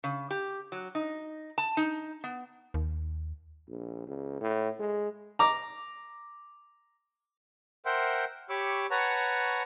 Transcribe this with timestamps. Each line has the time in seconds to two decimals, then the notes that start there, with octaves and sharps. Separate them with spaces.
0.04 C#3
0.31 G4
0.72 F#3
0.95 D#4
1.58 A5
1.77 D#4
2.24 B3
2.74 D#2
3.68 A#1
4.07 C#2
4.41 A2
4.79 G#3
5.39 A#5 D6
7.86 A#4 C5 E5 F#5 G5 C6
8.49 G4 C#5 B5 C#6 D6 E6
8.91 B4 C#5 F#5 A5 A#5 C#6